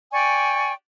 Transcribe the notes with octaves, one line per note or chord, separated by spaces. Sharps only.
D5 G5 G#5 C#6